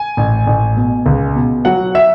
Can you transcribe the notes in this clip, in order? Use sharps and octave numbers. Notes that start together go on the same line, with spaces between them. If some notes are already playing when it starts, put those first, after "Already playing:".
Already playing: G#5
A1
A1
B2
C#2
B2
F#3 F#5
E5